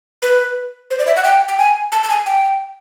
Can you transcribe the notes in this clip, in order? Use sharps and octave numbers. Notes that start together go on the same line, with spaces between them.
B4
C5
D5
E5
F#5
G5
G5
G#5
A5
A5
G#5
G5